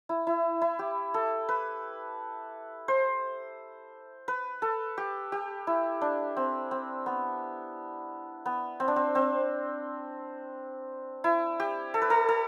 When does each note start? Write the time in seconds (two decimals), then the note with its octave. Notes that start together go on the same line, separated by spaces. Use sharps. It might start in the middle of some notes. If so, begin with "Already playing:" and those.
0.09 E4
0.27 E4
0.62 E4
0.79 G4
1.14 A4
1.49 B4
2.88 C5
4.28 B4
4.62 A4
4.98 G4
5.32 G4
5.67 E4
6.01 D4
6.37 C4
6.71 C4
7.06 B3
8.46 B3
8.80 C4
8.88 D4
8.96 C4
9.15 C4
11.24 E4
11.60 G4
11.94 A4
12.02 B4
12.10 A4
12.29 A4